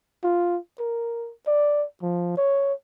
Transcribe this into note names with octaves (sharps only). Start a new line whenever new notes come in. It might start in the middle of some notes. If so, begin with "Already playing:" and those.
F4
A#4
D5
F3
C#5